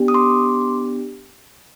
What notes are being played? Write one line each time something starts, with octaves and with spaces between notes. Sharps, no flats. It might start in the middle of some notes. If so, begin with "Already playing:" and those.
Already playing: B3 D4 G4
D#6
C6 D6